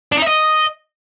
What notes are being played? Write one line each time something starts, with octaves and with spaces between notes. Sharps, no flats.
D4
D#4
E5
D#5